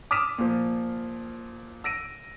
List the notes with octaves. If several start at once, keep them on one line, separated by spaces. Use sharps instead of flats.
D6 D#6 F6 B6 D#7 E7
A#2 F3
E6 A#6 D7 D#7